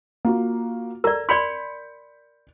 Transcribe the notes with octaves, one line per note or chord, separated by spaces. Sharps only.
A#3 F4 F#4
A4 A#4 D5 A#5 E6
D5 B5 C6 G6 B6 C#7